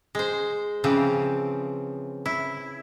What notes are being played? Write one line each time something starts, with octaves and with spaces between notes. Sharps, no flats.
G#3 C5
C#3 E3 F3 C4
E4